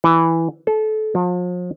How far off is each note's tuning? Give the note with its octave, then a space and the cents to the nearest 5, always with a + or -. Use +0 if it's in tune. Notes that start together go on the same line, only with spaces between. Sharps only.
E3 +0
A4 -25
F3 +40